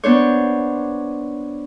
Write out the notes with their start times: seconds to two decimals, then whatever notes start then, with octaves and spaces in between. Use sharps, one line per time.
0.04 B3 D4 C5 C#5